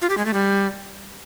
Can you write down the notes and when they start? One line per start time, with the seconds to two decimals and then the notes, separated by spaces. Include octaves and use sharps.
0.02 F4
0.10 G4
0.17 G#3
0.25 A3
0.33 G3